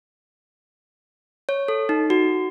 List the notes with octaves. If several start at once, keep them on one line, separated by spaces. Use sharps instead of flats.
C#5
A4
D#4
F#4